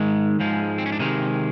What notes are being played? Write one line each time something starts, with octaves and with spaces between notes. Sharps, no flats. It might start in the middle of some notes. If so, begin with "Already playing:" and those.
Already playing: G#2 D#3 G#3
G#2 F3 G#3
C4
C#4
D4
C3 D#3 G#3 D#4